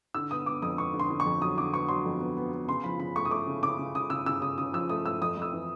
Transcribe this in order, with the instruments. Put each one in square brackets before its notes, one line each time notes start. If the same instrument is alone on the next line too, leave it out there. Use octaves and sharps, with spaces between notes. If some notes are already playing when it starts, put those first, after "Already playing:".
[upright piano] D3 E6
B3 D#6
B3 D6
F2 D#6
B3 C#6
D3
C6
D3
C#6
F2
F#3 D#6
D3 D6
B3 C#6
F#3 C6
F2
B3
B3
B3
C#3 C6
F3 B5
C#3 B5
A3 C#6
D#6
A3 D6
C#3
C#3 D6
C#3
C#3 D#6
C#3 E6
C#3 E6
C#3 D#6
C#3 D#6
F3 E6
A3 D#6
A3 E6
F2 D#6
F2 E6
E3